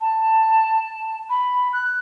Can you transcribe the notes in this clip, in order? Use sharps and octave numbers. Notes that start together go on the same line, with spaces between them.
A5
B5
F#6